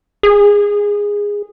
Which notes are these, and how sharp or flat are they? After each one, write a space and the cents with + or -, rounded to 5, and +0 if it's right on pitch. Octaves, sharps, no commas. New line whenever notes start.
G#4 -15